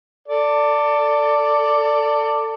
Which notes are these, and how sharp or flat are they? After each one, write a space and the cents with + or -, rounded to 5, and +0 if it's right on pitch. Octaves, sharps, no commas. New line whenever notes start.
A4 +25 D5 +0